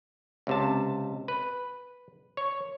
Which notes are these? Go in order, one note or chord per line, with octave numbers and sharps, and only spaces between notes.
C#2 C3 A5
B4
C#5